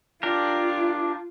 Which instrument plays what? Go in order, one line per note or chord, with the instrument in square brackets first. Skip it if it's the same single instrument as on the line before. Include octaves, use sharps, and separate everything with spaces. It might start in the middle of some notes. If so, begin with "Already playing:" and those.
[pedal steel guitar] D4 G4 A#4 [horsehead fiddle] F4